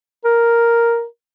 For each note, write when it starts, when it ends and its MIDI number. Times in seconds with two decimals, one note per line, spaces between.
0.25 1.05 70